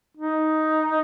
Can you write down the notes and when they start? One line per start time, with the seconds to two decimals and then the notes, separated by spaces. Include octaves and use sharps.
0.17 D#4